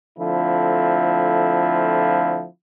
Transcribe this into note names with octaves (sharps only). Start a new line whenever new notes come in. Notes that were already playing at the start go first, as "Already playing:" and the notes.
D3 F3 A3 C4 E4 F4